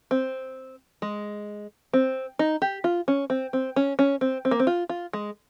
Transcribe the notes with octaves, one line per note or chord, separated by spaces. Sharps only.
C4
G#3
C4
D#4
G4
F4
C#4
C4
C4
C#4
C#4
C4
C4
A#3
C4
F4
F4
G#3